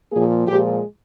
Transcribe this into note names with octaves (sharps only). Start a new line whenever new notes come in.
A#2 F3 A#3 G#4
A#2 F3 G#3 G4